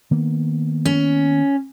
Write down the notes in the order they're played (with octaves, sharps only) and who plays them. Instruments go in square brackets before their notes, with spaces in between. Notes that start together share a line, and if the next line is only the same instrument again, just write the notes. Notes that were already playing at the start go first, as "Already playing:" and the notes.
[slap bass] D#3 A#3 B3
[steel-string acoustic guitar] C#4